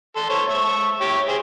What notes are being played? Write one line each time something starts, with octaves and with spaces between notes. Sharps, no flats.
A4 C6
C5 C#5 A5
E5 C#6
G4 C#5
G#4 C5